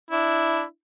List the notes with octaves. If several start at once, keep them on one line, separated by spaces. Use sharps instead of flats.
D4 E4